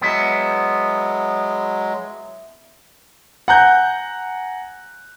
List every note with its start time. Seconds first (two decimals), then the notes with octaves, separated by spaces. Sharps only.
0.01 F#3 G#3 B3 E4
3.48 F#5 G#5 A#5 F#6 G6